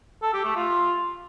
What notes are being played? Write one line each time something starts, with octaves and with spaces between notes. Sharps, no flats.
A4
G4
A3
F4